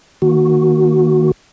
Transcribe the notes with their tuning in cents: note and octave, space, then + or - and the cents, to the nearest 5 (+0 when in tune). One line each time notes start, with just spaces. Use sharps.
D#3 +0 A#3 -5 F#4 +0